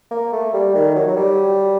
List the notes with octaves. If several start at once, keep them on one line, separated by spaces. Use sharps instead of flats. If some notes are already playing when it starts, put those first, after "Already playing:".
A#3
A3
G3
D#3
F#3
F#3
G3